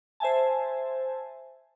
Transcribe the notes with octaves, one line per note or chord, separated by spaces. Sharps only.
C5 E5 G#5 A5